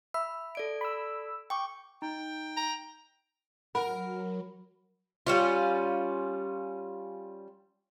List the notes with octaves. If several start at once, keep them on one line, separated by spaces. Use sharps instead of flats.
E5 B5
A4 D5 D7
B5 E6
G5 C#6 D6
D#4 G5
A#5
F#3 A#4 F#5 B5
G3 C#4 F4